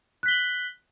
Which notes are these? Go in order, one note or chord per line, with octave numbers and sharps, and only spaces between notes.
F#6 B6 F#7 G7